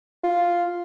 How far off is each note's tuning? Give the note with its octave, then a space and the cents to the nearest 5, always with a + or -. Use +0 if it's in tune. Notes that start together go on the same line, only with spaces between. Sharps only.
F4 +0